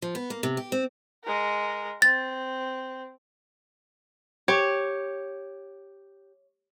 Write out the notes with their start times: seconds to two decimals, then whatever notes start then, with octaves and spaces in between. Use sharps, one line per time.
0.02 F3
0.15 B3
0.30 A#3
0.43 C3
0.57 G4
0.72 C4
1.24 G#3 A#4
2.02 C4 A6
4.48 G4 C#5